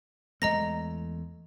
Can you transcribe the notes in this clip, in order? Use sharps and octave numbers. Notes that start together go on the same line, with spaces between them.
E2 G#3 A3 D#5 A#5 A#6